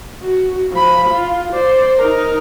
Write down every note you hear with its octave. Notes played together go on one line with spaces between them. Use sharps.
F#4
F3 B5
F4
C5 D5
D#4 A#4